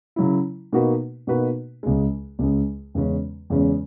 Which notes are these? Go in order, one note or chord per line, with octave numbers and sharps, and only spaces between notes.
C#3 F#3 C#4 E4
B2 A#3 D#4 F#4 B4
B2 A#3 D#4 F#4 B4
C#2 C#3 G#3
C#2 C#3 G#3
E2 C#3 G#3 C#4
E2 C#3 G#3 C#4